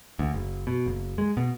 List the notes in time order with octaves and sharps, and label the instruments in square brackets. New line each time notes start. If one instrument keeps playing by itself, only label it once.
[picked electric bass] D2
F#1
B2
F#1
G#3
B2